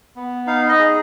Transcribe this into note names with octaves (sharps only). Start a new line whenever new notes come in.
B3
D#4 F5
D#5
G#4